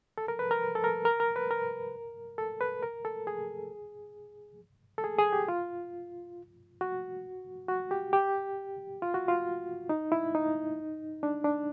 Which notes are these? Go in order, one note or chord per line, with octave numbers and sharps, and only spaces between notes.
A4
A#4
B4
A#4
A4
A#4
A#4
A#4
B4
A#4
A4
B4
A#4
A4
G#4
A4
G#4
G#4
G4
F4
F#4
F#4
G4
G4
F4
F#4
F4
D#4
E4
D#4
D4
D4